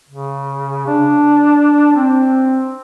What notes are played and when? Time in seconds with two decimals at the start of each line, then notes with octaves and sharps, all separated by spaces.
0.10 C#3
0.87 D4
1.96 C4